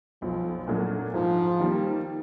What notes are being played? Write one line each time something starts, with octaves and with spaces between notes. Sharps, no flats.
B1 F3
A#2 F#3 A3 D4
G#2 F3
D#3 G3 A#3